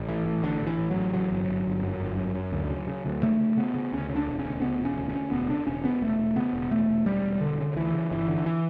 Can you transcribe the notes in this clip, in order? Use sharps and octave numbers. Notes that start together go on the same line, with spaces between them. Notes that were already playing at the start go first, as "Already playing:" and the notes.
Already playing: A1
A2 E3
A2
A1 D3
A1
E3
A2
F#3
A1
C#3 F#3
G1
G1
G1
F#2
G1
F#2
F#2
D2
C#3
C#3
D2
C#3 A3
C#3
C#3 B3
C#3
D2 C#4
C#3
D4
E1
C#4
D2
C#3 B3
E1
C#4
D2
C#4
D2
E1 B3
C#3 D4
E1 C#4
C#3 B3
E1 A3
E1
C#3 B3
E1
E1 A3
E1
E1 G3
E1
E1 D3
C#3
D2 E3
C#3
G1 E3
D3
E3